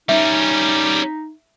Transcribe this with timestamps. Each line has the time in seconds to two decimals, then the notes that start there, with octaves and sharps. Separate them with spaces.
0.09 G3 C#4 D#4 E5